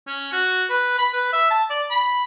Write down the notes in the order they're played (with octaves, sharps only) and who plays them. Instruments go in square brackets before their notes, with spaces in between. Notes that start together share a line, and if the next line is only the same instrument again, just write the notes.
[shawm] C#4
F#4
B4
B5
B4
E5
A5
D5
B5